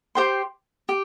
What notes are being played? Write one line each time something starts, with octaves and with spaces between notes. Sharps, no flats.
G4 C5 G5 C6
G4